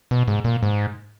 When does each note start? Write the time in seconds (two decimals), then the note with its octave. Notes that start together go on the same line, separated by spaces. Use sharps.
0.11 B2
0.28 G#2
0.45 A#2
0.63 G#2